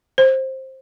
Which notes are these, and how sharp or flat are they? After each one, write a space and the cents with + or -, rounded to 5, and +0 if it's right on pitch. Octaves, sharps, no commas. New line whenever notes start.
C5 +15